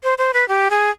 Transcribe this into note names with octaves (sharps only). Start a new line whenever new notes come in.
C5
C5
B4
G4
G#4